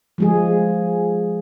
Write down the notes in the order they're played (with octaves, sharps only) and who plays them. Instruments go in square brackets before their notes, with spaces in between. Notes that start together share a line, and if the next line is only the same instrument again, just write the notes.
[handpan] F3 G#3 G#4